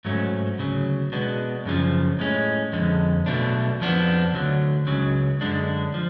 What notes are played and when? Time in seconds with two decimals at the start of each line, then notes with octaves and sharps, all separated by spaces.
0.05 G#2 F#3 A3 C#4
0.58 D2 C#3 F#3
1.12 B2 G#3 B3 D4
1.65 F#2 C#3 F3
2.19 A2 G#3 C#4
2.73 F2 D3 G#3
3.26 B1 B2 A3 D4
3.80 F2 F3 B3 D4
4.33 D2 D3 F#3
4.87 C#2 C#3 F#3
5.41 F#2 D3 G#3 D4
5.94 F3